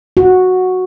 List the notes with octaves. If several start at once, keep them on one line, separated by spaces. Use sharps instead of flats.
F#4